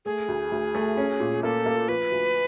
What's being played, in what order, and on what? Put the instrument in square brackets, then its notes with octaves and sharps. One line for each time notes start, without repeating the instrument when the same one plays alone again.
[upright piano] A3 [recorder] G#4
[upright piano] D2
D2
A3
C#4
A#2
[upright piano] A#3 [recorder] A4
[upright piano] A#3
[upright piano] F3 [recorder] B4
[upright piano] D2